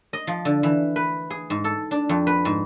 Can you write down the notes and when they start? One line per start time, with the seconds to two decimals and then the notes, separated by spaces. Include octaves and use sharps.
0.13 D#5
0.27 F3
0.45 D3
0.63 E3
0.96 B4
1.30 G#4
1.50 G#2
1.64 A4
1.91 D4
2.09 F2
2.27 B4
2.45 G#2